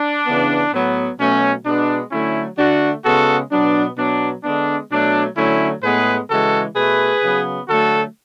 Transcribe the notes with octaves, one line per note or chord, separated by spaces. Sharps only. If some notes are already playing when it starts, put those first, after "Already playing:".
Already playing: D4
C#3 E3 B3
A2 F#3 B3
B2 F#3 A3 C#4
B2 G#3 B3 D4
D3 F#3 A3 C#4 E4
D3 A3 D4 F#4
C#3 G#3 B3 F#4 A4
B2 F#3 B3 D4
B2 F#3 B3 D4
D3 G#3 B3 D4
B2 F#3 A3 D4
D3 F#3 A3 C#4 E4
A2 G#3 B3 G#4 B4
C#3 E3 G#3 F#4 A4
B2 A3 G#4 B4
C#3 F#3 B3
D3 F#3 A3 F#4 A4